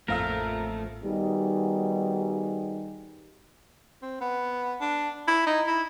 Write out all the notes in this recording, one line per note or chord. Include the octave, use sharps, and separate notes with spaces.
A1 F2 A3 A#3 A#4 F5 E6
D#3 G3 B3 D#4 F#4 G#4
C4
B3
D4
E4
D#4
E4